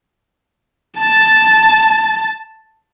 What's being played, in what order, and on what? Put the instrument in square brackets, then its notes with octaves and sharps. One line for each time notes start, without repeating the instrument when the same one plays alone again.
[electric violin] A5 A6